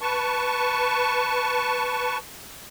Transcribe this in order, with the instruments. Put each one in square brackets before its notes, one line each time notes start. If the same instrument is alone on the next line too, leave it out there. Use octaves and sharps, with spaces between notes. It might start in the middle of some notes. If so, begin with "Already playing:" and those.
[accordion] B4 A5 C#6